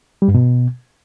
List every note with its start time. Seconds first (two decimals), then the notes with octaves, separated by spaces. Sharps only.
0.22 G3
0.28 G2
0.35 B2